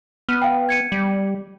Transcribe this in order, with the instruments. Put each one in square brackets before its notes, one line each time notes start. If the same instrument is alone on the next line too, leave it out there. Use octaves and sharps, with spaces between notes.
[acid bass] B3 [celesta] F6 D#7
[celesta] F5 G5
G#6 C#7 D#7
[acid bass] G3